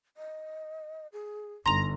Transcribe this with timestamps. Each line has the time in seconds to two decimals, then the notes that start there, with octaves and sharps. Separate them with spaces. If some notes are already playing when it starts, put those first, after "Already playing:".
0.17 D#5
1.13 G#4
1.66 G1 D#4 A#5 C6 F7